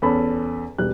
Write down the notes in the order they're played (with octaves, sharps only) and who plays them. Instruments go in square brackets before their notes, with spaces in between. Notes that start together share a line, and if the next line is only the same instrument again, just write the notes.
[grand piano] E2 C#4 A4 C#5 B5
E1 G3 F#6